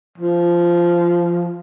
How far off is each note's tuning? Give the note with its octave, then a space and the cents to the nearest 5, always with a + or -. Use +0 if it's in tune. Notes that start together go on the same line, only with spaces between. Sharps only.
F3 -15